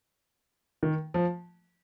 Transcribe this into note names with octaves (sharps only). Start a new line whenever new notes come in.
D#3
F3